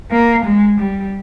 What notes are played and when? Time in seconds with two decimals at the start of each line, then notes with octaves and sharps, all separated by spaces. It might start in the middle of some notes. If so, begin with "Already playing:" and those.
0.11 A#3
0.45 G#3
0.80 G3